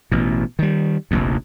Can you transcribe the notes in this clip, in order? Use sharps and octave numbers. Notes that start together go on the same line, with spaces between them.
A1 B2
D#3 G3
F1 A#1 D#2